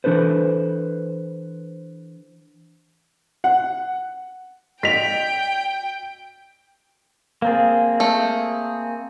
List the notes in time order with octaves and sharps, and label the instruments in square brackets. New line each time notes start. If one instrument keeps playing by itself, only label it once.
[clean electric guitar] E3 D4 A4 B4 C5
[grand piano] F#5
[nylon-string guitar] F#4 D5 D#5 [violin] G5 [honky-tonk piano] B6 F7
[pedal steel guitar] A#3 C4 G#4 [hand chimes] F5 A#5 A6
[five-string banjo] A3